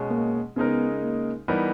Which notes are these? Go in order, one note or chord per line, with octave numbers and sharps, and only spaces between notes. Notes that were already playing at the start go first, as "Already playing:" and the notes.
Already playing: B2 G#3 C#4
A#3
C#3 G#3 B3 D#4 A#4
A#3
E3 G3 B3 D#4 A#4